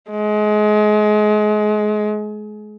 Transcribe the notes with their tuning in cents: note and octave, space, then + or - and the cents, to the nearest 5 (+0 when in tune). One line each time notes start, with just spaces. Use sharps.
G#3 +30